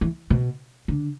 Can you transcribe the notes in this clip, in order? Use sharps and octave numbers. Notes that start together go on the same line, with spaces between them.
E3
B2
D3